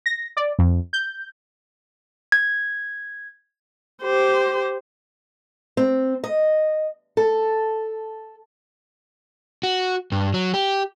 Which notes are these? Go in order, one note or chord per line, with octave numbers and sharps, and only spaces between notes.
A#6
D5
F2
G6
G#6
G4 C5
C4
D#5
A4
F#4
G2
F#3
G4